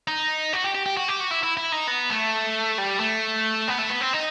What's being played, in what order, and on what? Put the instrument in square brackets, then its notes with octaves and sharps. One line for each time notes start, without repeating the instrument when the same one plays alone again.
[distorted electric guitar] D#4
F#4
G4
G4
G4
F#4
G4
F#4
E4
E4
E4
D#4
B3
A3
G3
A3
B3
A3
B3
C4
D#4